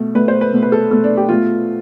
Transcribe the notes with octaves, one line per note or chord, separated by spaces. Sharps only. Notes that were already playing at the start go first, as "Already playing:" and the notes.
Already playing: B2 A3
B2 A3 B4
C5
B4
B2 A3
B4
A4
B2 A3 A4
D4
G4
B2 A3 F4